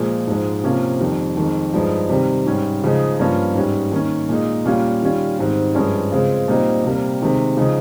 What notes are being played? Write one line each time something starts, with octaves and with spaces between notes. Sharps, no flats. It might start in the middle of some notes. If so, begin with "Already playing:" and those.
Already playing: A#2 F3 G#3
G#2 F3 G#3
C3 F3 A#3 C#4 F4
F2 D#3 G3
F2 D#3 G#3
G2 F3 G#3 D#4
C3 D#3 G3
G#2 G3 C#4
C#3 F3 G#3 D#4
G2 F3 A#3 C#4 F4
G#2 G3 C#4
D#3 A#3 C#4
A#2 G#3 D#4
A#2 G3 C#4 F4
D#3 G3 C#4 F4
G#2 D#3 G3 C4
G2 F3 G#3 C#4
C#3 G#3 C4 F4
A#2 G3 C4 D#4
C3 G3 A#3
C3 D#3 G#3
C#3 F3 G#3 D#4